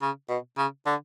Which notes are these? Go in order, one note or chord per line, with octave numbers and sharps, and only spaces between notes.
C#3
B2
C#3
D3